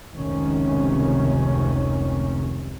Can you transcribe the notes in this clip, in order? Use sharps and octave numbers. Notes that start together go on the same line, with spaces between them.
F1 C#2 C3 D#3 C#4